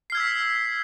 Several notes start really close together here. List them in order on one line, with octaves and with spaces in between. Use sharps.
C7 F6 G#6 E6 B6